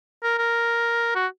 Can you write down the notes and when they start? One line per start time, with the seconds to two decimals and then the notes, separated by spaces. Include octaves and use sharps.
0.23 A#4
0.38 A#4
1.15 F#4